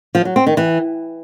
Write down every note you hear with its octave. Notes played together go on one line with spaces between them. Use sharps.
F3
F#3
C4
D#3
E3